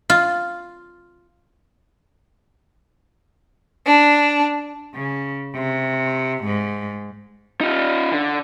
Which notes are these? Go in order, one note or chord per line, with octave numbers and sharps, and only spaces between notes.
F4
D4
C#3
C3
G#2
D#4 F4
D3